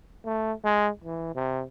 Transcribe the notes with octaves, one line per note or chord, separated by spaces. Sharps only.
A3
G#3
E3
C3